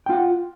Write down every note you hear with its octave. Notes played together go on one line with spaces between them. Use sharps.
F4 F#5 G5